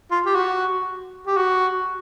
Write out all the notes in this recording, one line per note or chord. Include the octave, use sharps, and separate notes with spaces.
F4
G4
F#4
G4
F#4